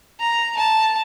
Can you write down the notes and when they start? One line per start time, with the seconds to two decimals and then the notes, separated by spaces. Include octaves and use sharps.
0.20 A#5
0.57 A5